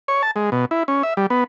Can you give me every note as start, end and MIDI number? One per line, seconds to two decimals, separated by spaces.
0.08 0.22 73
0.23 0.31 81
0.36 0.50 56
0.52 0.65 47
0.71 0.83 64
0.88 1.03 61
1.03 1.14 76
1.17 1.26 55
1.30 1.44 59